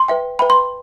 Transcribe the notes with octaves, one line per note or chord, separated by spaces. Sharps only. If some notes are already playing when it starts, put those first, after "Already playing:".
Already playing: C6
B4 E5 G5
B4 E5 G5 B5
C6